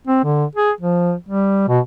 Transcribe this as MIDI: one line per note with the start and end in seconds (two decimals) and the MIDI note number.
0.07 0.21 60
0.24 0.45 50
0.55 0.71 68
0.81 1.14 53
1.29 1.68 55
1.68 1.79 47